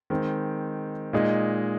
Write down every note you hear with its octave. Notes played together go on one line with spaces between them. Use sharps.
D#3 G#3 C4
A#2 G#3 D#4